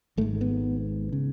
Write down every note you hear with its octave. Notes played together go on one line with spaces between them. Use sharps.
G#1 G#2 A3
B3
C#3